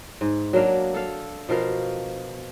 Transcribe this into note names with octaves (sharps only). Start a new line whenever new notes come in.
G#2
F#3 A#3 D4 F5
A4 F5
B2 F3 A#4 F5